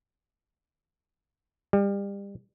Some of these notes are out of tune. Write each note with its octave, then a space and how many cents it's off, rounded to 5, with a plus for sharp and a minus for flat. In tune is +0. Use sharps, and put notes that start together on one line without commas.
G3 +30